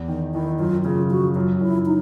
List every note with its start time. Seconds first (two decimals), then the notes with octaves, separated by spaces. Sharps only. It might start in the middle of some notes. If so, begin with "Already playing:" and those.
Already playing: E2
0.08 D#3
0.34 D#3 E4
0.59 F#2 F4
0.85 C#3 F4
1.11 F3 F#4
1.35 F#2 F4
1.61 F#2 E4
1.86 D#4